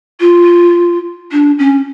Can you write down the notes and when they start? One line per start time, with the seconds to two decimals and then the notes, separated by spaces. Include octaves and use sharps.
0.20 F4
1.32 D4
1.58 C#4